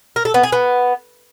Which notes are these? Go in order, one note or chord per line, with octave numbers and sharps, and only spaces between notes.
A#4
A4
B3
G#4
B3